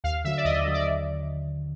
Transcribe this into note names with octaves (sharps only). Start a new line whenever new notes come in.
D#2 F5
D3 F#3 E5
D5
D#2 D#5
D3 F#3
D5